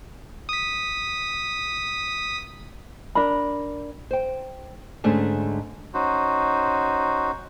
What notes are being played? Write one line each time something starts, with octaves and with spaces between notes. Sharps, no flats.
D#6 B6
D4 A#4 B5
C5 G5
G#2 D3 A3 C#4 D4 G#4
C#4 D#4 F#4 C5